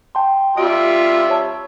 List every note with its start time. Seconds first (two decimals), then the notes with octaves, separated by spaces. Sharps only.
0.15 G5 A5 C6
0.58 G3 F4 E5 D7
1.30 C#5 A5